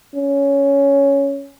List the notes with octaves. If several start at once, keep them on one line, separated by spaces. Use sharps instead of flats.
C#4